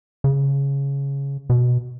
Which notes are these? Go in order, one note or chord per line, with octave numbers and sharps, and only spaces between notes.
C#3
B2